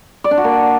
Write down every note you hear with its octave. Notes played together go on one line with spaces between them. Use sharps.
D5
D4
F#4
A#3